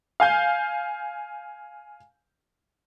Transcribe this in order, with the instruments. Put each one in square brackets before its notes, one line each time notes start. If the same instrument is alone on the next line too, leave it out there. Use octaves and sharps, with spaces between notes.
[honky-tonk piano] F5 G#5 G6